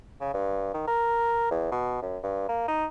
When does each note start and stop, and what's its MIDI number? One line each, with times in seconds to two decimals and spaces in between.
0.21 0.33 49
0.34 0.69 43
0.74 0.85 51
0.88 1.49 70
1.51 1.68 40
1.72 1.99 47
2.02 2.18 42
2.23 2.44 43
2.49 2.66 58
2.68 2.86 63